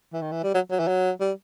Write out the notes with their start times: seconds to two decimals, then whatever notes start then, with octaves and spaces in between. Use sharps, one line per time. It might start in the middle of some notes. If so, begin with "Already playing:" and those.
0.13 E3
0.22 D#3
0.32 E3
0.43 G3
0.54 F#3
0.71 F#3
0.79 E3
0.87 F#3
1.20 G3